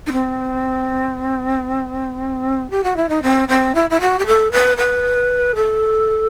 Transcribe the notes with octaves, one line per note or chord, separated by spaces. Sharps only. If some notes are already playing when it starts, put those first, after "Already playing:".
D#4
C4
G4
F#4
E4
D#4
C4
C4
E4
E4
F#4
G4
A4
B4
B4
A4